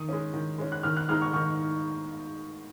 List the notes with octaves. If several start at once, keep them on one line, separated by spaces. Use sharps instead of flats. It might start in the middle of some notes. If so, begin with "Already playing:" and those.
Already playing: D#3 D#6
G#3 C#4
D#3
G#3 C#4
F#6
D#3 F6
F#6
G#3 D#4 F6
C#6
D#3 C#6